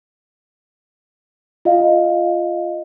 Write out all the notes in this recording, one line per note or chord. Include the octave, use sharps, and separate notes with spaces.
F4 D#5 F5